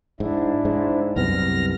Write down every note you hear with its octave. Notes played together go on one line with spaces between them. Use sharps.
G#2 D4 E4
G#2
C2 F#2 B3 F6 A#6